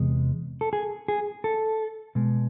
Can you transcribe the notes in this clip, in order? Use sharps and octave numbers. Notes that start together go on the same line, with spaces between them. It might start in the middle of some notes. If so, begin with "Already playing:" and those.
Already playing: E2 C3 G#3
A4
G#4
G#4
A4
B2 G#3